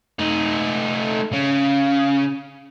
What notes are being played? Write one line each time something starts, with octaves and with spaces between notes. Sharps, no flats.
A3 D#4
C#3